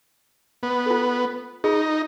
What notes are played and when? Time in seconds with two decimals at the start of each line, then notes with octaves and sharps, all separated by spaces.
0.63 B3
0.86 F4 A4
1.64 D#4 F4 G#4 C#6